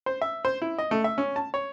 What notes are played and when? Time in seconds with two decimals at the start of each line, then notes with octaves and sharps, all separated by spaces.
0.06 C5
0.22 E5
0.45 C5
0.62 E4
0.78 D#5
0.91 A3
1.04 E5
1.18 C#4
1.36 A5
1.54 C#5